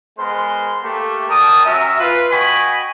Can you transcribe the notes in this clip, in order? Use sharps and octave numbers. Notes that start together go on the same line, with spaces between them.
G#3 B3 A#4 C5 C6
A3 A#3 G4
G3 A#4 G5 A5 D#6
C#4 F#4 A#4 E5
F4 B4
F#4 D#5 G5 G#5 B5 C#6